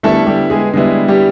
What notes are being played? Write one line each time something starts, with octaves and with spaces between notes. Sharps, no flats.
D3 G3 A3 B3 E4 A4
G3 G4
G#3 G#4
D3 G3 G#3 B3 E4 G#4
G3 G4